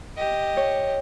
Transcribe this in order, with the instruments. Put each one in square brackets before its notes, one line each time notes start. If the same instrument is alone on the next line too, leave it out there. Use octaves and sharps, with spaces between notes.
[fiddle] G4 D#5
[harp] C#5